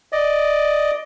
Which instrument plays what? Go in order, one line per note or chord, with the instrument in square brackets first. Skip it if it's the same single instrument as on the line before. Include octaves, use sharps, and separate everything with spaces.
[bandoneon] D5 D#5